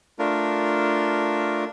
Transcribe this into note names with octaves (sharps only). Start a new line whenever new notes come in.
A3 D4 F4 A#4